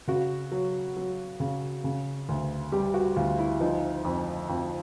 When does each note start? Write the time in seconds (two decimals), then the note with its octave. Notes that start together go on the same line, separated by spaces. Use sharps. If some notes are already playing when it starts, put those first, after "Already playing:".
0.08 C#3 F#4
0.52 F#3
0.97 F#3
1.40 C#3
1.84 C#3
2.29 D2
2.72 G3 G4
2.94 F#4
3.16 D2 F4
3.39 E4
3.60 F3 D#4
4.05 F2
4.49 F2